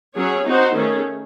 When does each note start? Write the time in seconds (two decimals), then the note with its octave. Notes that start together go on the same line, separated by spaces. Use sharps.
0.16 F#3 C#4 G#4 C#5
0.46 C4 D#4 F#4 C5
0.76 D#3 A3 C#4 G#4